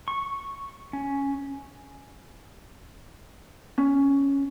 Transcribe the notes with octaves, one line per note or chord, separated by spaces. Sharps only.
C#6
C#4
C#4